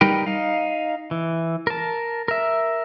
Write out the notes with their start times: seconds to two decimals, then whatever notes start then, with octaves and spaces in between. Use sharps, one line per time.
0.01 G3 D#4 A#4 B4 G5
0.26 D#4 F5
1.11 E3
1.67 A#4 A5
2.28 A#4 E5